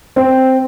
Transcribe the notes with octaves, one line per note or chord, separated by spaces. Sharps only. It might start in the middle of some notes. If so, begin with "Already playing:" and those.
C4